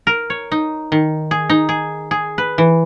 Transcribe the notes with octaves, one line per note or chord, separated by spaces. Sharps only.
A#4
C#5
D#4
D#3
G#4
D#4
G#4
G#4
B4
E3